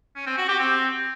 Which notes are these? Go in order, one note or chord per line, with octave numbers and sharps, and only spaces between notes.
C#4
C4
F#4
G4
C4